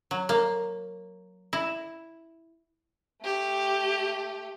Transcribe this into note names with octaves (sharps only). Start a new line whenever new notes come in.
F#3
A#3
E4
A3 G4